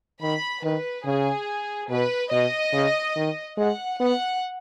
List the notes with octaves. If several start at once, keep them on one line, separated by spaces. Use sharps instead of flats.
D#3 B5
D#3 B4
C#3 G#4
B2 B4
B2 D#5
C#3
D#3
G#3 F#5
B3 F#5